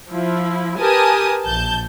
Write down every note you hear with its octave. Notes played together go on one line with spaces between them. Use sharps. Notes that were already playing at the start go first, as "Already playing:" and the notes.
F3 E4
G4 A#4 B4 G#5 A5 D#6
A#1 A5 G6